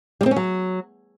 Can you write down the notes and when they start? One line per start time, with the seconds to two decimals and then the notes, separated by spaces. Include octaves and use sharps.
0.21 G3
0.26 C4
0.31 C#4
0.36 F#3